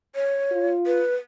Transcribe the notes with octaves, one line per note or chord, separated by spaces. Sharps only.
C#5
F4
B4